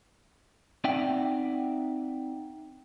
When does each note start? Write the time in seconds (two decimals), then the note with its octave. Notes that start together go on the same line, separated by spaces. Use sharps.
0.84 C4 D#4 D5 E5 F#5 G5